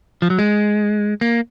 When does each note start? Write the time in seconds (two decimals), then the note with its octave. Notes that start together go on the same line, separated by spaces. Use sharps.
0.22 F3
0.30 F#3
0.39 G#3
1.21 A#3